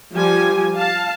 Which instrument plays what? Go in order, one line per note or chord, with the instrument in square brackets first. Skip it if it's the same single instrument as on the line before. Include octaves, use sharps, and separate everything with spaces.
[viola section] F3 G3 G#5 [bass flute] G4
[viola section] F5 A5